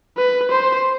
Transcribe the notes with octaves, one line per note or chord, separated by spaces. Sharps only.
B4
C5